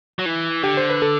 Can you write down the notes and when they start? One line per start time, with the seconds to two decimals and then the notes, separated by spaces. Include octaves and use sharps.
0.19 F#3
0.26 E3
0.63 D3 G4
0.77 C5
0.90 B4
1.02 A4